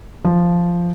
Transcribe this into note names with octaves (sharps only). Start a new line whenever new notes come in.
F3